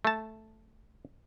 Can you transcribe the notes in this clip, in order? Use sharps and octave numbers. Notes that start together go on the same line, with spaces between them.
A3 A5